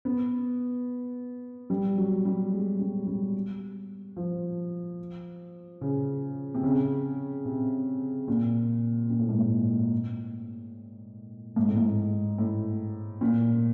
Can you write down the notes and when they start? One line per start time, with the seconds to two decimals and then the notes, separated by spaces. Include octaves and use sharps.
0.05 B3
1.70 G3
1.97 F#3
2.25 G3
2.52 G#3
2.79 G3
3.07 G3
4.16 F3
5.81 C#3
6.54 C3
6.63 C#3
7.45 C3
8.28 A#2
9.10 A#2
9.19 A2
9.29 G#2
9.39 A2
11.56 G#2
11.67 A2
11.76 G#2
12.38 A2
13.21 A#2